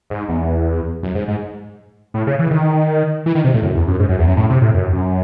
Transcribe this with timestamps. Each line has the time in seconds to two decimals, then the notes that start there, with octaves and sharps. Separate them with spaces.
0.10 G#2
0.29 E2
1.03 F#2
1.15 G#2
1.28 G#2
2.14 A2
2.27 C#3
2.39 E3
2.51 D#3
3.26 E3
3.35 D#3
3.44 C3
3.54 A2
3.63 F#2
3.75 E2
3.88 F#2
3.99 G#2
4.09 F#2
4.19 E2
4.27 F#2
4.37 A2
4.50 C3
4.61 A2
4.74 F#2
4.93 F#2